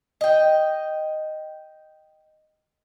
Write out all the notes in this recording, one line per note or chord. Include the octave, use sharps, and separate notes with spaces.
D#5 G5